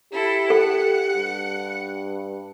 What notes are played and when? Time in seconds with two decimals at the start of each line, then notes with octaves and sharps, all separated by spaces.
0.12 E4 G4 A4
0.50 A4 F#5
1.15 G2